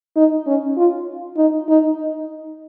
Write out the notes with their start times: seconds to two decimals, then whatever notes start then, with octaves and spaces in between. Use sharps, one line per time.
0.16 D#4
0.47 C#4
0.77 F4
1.37 D#4
1.69 D#4